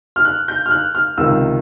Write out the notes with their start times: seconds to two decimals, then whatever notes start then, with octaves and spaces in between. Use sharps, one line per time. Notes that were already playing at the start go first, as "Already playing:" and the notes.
0.16 F6
0.25 F#6
0.48 G6
0.66 F6
0.71 F#6
0.95 F6
1.17 C#2 C3 D#3 E6